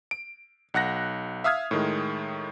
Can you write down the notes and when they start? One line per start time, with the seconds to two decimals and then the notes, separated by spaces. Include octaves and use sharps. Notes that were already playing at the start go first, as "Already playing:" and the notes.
0.11 D7
0.74 B1 F#5 F#6 A#6
1.44 E5 F5 D#6 F6 G#6
1.71 A2 D#3 G#3